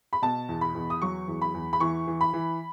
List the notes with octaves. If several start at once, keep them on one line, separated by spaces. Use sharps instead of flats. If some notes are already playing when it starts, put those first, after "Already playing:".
B5
B2 A5
E2
B5
E2
D#6
F#3 C#6
E2
B5
E2
B5
E3 C#6
E3
B5
E3